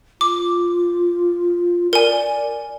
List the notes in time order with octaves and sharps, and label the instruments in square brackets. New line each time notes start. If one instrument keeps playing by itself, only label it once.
[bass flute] F4 [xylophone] D6
[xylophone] A#4 G#5 [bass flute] D5